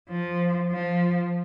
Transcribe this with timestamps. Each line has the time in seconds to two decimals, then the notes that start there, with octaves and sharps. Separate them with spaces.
0.08 F3
0.69 F3